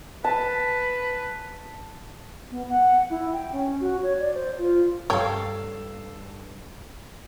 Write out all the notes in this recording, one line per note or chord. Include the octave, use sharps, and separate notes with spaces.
B4 A5
B3
F#5
E4
G5
C#4
F#4
C#5
D5
C5
F4
G2 A4 C#5 F5 G5